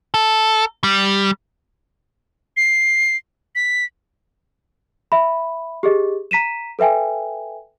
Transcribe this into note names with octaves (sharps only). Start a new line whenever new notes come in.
A4
G3
C7
B6
E5 B5
G4 G#4 D#5
A#5 B6 D#7 E7
A4 B4 E5 G5 G#5